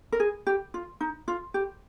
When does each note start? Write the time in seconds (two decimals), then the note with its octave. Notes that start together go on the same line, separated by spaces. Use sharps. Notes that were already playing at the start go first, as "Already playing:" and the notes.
0.12 A#4
0.20 G#4
0.47 G4
0.74 F4
1.01 D#4
1.28 F4
1.54 G4